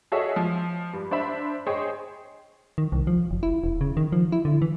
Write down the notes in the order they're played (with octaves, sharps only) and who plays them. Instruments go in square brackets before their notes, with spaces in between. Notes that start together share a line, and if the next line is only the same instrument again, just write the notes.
[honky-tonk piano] F#4 G#4 A4 C#5 D#5 E5
F3
G2
D4 C5 E5 B5
G#4 C5 C#5 D#5 G5
[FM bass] D#3
C2
F3
F#1
E4
E1
C#3
D#3
F3
E4
D3
E3